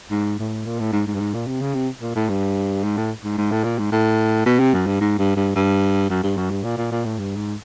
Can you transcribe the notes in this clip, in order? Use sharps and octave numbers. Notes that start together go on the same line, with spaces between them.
G#2
A2
A#2
A2
G#2
G#2
G2
G#2
A#2
C3
C#3
C3
A#2
A2
G2
G#2
A2
G#2
G#2
A2
A#2
G#2
A2
B2
C3
F#2
G2
G#2
G2
G2
G2
F#2
G2
F#2
G2
A#2
A#2
A#2
A2
G2
G#2